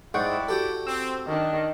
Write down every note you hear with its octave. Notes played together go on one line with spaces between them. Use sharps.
G#2 G#3 E4 D5 F#5 G5 C#6
F#4 G4 A4
C4 E6
D#3 D4